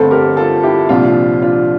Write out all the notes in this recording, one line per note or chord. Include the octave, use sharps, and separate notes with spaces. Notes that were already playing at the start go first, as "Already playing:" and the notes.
Already playing: G1 F2 D3 A3 A4 C5
G4 A#4
F4 A4
E4 G4
C2 A#2 F3 D4 F4
D4 F4